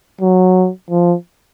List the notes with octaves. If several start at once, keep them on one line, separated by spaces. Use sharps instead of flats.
F#3
F3